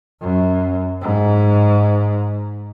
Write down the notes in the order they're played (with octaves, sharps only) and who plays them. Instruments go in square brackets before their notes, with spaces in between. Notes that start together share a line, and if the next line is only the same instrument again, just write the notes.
[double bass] F#2
G#2